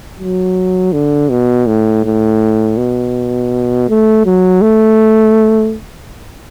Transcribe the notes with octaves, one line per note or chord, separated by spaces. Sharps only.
F#3
D3
B2
A2
A2
B2
A3
F#3
A3